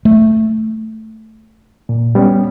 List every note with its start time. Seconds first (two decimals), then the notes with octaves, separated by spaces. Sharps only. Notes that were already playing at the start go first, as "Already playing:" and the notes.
0.05 A3
1.89 A#2
2.15 G3 B3 C#4